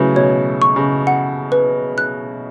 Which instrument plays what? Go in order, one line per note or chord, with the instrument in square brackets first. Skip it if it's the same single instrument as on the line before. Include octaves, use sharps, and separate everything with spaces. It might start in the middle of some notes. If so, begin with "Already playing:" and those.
Already playing: [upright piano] C#3 E3 F#3 A3
[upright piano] B2 [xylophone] C#5
[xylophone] C#6
[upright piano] C#3
[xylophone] F#5
B4
F#6